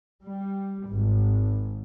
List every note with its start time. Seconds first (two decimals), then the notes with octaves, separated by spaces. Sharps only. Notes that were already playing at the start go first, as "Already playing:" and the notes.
0.23 G3
0.88 G#1